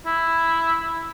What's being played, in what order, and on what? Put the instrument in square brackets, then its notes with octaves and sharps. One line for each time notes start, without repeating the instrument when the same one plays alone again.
[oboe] E4